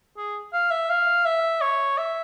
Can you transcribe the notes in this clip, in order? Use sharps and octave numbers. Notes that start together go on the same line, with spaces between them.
G#4
F5
E5
F5
E5
C#5
E5